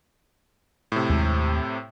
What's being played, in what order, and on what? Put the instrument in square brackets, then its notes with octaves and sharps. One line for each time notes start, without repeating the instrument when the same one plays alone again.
[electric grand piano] A2 C3
[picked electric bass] D#2 G#3 A3